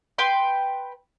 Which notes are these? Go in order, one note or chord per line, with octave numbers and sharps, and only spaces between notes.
B4 G5 C6